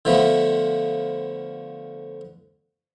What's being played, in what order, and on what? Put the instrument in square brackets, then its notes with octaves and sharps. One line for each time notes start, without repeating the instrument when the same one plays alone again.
[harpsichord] D3 F3 A3 B3